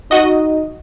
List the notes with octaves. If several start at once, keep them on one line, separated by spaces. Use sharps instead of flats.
D#4 F#4 D#5